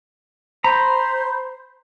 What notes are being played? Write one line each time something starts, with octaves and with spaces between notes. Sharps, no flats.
C5 A#5 B5